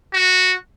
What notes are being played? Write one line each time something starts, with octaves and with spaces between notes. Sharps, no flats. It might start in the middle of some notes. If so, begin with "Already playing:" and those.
F#4